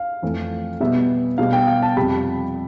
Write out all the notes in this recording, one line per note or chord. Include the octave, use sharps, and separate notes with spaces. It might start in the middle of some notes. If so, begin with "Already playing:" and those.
Already playing: F5
F2 E3 A3 C4
B2 G3 B3 E5
B2 G3 B3 F5
G5
F5
A5
F2 C3 G3 B5